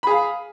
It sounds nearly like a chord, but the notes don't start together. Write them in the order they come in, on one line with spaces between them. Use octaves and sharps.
B5 G#4 F5